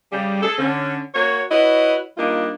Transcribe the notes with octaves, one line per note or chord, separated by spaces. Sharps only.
C#3 G3
G#4 A4
D3 C#4
A#3 F#4 C#5
E4 F#4 B4 C#5 D#5
G3 A#3 D4 D#4 F4